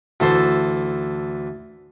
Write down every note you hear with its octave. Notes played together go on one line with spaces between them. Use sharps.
D2 E3 A4 C5